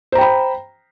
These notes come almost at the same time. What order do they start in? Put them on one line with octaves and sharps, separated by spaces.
C5 A#5 G5 B5